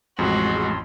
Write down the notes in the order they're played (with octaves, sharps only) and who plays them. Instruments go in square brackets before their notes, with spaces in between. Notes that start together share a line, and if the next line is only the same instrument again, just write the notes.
[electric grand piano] A1 F2 [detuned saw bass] G#3 [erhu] F#4 [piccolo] C6